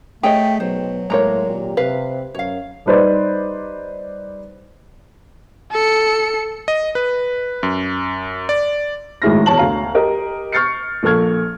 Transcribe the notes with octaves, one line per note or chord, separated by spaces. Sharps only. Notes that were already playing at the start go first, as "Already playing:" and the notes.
A3 G4 G#4 C#5 D#5 G5
B1 F#3 B3 C5
A2 G#3 A#3 C#5 A#5
G#1 A#2 G4
C3 B4 F5
F#2 C#5 F5
G3 D#4 B4 C5 D5
A4 C#7
D#5
B4
F#2
D5
G#1 A2 G#3 E4 F6 A#6
E1 C#5 A5 F#7
D2 F5 A#5
G4 A#4 D#5
C#6 F6 G6 A6 C7 C#7
A#1 A#3 A4 C#6 F6 G#6